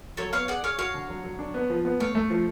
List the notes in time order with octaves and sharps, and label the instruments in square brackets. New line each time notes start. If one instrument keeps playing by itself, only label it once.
[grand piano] F#3 [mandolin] A4 C#5
[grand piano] B3 [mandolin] C#5 F5
[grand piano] G#4 [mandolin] D5 F#5
[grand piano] G#4 [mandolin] C#5 F5
[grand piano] F#4 [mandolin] C#5 F5
[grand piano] D3
F#3
F#3
D4
B3
F3
B3
[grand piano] A3 [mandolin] C#5 F5
[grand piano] A3
F3